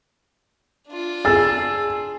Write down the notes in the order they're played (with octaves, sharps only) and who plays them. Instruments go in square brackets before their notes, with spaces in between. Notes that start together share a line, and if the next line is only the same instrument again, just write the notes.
[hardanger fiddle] D4 F4
[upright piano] G#4 E6 [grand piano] A6